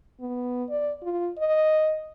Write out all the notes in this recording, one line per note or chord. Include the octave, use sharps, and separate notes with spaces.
B3
D5
F4
D#5